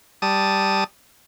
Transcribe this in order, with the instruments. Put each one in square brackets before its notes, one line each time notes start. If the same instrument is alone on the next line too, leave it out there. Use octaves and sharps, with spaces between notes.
[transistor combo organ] G3 A5 D#6